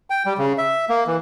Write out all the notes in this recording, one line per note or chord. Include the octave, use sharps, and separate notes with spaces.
G5
G3
C#3
E5
A#3
E3